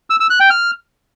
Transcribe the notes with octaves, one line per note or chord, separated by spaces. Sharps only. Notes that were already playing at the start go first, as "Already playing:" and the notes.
E6
E6
F#6
G5
F6